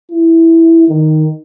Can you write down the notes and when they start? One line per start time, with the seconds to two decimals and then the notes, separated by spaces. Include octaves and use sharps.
0.11 E4
0.89 D#3